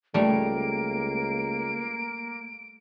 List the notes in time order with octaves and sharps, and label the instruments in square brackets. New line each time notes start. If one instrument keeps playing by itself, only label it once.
[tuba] C#2 [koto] G3 A3 [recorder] A#3 [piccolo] D7